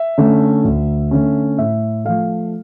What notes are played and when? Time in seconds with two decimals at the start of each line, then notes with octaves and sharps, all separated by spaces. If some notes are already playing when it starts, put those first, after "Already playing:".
Already playing: E5
0.18 D3 A3 C#4
0.64 D2
1.11 D3 A3 C#4
1.58 A2 E5
2.05 F3 A3 F5